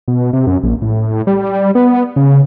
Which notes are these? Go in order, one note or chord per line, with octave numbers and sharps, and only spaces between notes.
B2
C3
F#2
A#1
A2
G3
B3
C#3